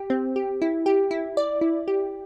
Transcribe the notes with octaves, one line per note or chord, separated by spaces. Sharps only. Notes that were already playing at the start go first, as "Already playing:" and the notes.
Already playing: G4
C4
G4
E4
G4
E4
D5
E4
G4